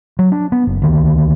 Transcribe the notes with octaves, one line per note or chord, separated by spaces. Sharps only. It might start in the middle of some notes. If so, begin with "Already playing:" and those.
F#3
D4
B3
F#1
D2 D#3